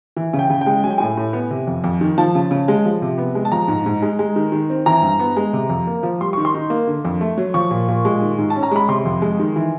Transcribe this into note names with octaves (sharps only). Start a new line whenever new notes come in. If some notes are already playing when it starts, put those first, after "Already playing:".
E3
C#3
G5
C#3
G5
G#3
F#3 G#5
G5
A2 G#5
A2
B3
C3
F2
F2
D#3
F3 A5
C#3
C#3
G#3
F3
C3
B3
G#3
A5
F3 A#5
G#2
G#2
G#3
G#3
D#3
D#3
C4
E3 A#5
G2
B3
G#3
C3
F2
A#3
F3
G3 C6
D#3 C#6
C6
D#4
A#3
D3
F2
A3
F#3
F3 C#6
A#2
A#2
G#3
D#3
G#2
A5
C#4
A#5
G#3 B5
C3 C6
F2
G#3
D#3
E3